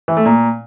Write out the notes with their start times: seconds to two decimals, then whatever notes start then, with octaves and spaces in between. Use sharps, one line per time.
0.08 E3
0.17 A3
0.26 A#2